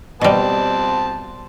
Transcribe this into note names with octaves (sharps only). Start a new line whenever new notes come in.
B2 G3 C4 A5